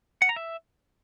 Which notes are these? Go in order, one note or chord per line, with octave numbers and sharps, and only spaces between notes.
F#5
A#5
E5